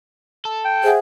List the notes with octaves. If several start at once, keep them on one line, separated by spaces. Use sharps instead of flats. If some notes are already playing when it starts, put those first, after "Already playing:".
A4
G5
G#4 C5 E5 F#5